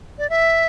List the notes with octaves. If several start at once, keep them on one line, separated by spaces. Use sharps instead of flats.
D5
E5